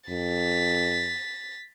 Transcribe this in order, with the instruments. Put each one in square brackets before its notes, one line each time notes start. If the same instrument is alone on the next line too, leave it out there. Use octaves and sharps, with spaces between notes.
[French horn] F2 [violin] A6 B6